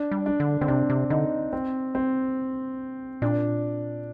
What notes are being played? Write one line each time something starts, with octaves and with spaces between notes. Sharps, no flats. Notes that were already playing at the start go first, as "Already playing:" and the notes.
Already playing: D4
G3
D4
D3
D3 C4
C3 D4
C3
D3 D#4
C4
C4
A#2 D4